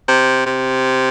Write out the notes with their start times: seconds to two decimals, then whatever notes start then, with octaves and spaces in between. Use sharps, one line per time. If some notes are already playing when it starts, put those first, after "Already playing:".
0.08 C3
0.46 C3